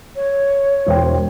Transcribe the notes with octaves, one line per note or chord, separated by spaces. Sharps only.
C#5
E1 C5 G5